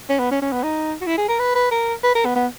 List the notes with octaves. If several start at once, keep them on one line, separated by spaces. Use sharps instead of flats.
C#4
B3
C#4
C#4
B3
D#4
F#4
E4
G#4
A#4
B4
B4
A#4
B4
A#4
B3
B3